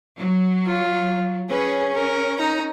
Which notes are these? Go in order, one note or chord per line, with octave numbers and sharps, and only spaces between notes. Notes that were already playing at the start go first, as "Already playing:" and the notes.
F#3
F4
C#4 G#4 B4
A#4
D#4 A#5